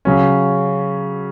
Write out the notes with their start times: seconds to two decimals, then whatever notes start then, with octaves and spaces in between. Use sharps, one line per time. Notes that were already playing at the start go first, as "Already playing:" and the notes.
0.05 C#3 F#3 C#4